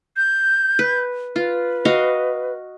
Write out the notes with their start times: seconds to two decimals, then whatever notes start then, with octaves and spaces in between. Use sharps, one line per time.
0.17 G6
0.79 B4
1.36 F4 B4
1.85 F#4 D#5 F5